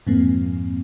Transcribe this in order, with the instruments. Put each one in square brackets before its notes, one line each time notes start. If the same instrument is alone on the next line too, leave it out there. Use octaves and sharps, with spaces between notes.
[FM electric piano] F2 G#2 F3 A#3 C4